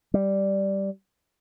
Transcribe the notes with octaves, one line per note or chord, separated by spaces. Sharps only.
G3